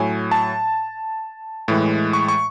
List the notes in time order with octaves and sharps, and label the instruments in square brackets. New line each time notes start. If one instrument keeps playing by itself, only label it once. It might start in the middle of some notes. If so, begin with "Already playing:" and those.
Already playing: [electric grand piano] A2 F#3 G#5
A5
A2 E3 G#3
C#6
C#6